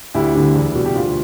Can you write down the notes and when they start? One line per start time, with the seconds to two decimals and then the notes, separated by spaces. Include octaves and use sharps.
0.14 D2 E4 G4
0.35 D3 G3
0.55 E2
0.75 B2 G3
0.85 G4
0.95 D2 F4